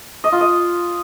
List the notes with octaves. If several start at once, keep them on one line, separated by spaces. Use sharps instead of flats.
D#5
F4
D#5